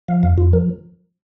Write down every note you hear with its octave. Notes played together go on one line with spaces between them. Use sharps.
F3 F5
F2 F5
F2 F4
F3 A#4